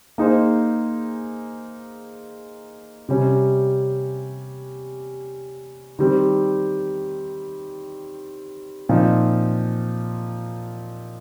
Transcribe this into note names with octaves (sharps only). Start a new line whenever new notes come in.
A#3 D#4 G#4 C5
C3 G3 C#4
D#3 G3 C4
A#2 F3 C4 D#4